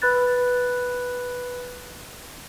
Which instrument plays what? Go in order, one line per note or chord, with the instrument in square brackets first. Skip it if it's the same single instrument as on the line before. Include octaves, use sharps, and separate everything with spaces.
[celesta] B4 B5 F#6 A6